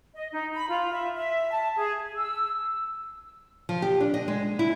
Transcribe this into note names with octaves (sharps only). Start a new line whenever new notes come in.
D#5
D#4
B5
F4
E5
E5
A5
G#4
E6
F3
G4
D4
D#5
G#3
E4